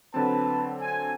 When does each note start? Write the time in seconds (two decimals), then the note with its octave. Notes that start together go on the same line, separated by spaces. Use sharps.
0.14 D3 F#3 C4 B4 A5
0.80 G#5